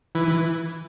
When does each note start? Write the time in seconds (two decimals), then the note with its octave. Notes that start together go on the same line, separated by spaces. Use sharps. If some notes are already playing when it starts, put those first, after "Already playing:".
0.15 E3
0.28 E3